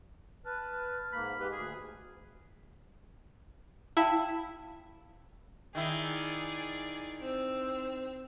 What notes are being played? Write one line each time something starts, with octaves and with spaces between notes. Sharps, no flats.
B4 A5 F6
G#2 A#3 B5
G#3 G4 B4
D2 G#4
E4 F5 G5 A5
D#3 E4 G#4 D5
C4 E6